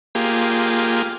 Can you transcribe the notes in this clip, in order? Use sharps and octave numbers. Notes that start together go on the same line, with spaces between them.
A#3 F4 G4 G#4